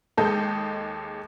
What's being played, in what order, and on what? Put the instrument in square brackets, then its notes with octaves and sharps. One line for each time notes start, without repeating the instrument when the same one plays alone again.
[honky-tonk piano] D#2 G#3 A4 D#5 G6